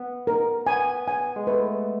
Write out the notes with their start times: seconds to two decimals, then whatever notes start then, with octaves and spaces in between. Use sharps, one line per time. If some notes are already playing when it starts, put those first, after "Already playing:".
Already playing: B3
0.27 A#4
0.67 B3 G#5
1.08 G#5
1.36 G#3
1.47 A3 B4